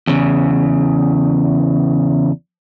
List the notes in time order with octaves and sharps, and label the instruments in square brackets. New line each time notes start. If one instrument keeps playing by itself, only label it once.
[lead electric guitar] E2 C#3